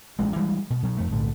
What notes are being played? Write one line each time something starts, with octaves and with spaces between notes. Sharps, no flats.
A1 G#3
E3 G3 G#3
B2
B2 F#3
F2 A3
B1 A2 D3